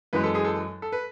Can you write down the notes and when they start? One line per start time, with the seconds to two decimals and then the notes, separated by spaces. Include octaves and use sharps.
0.13 F#2 E3 G#3 B4
0.24 A4
0.35 G#4
0.45 A4
0.82 A4
0.92 B4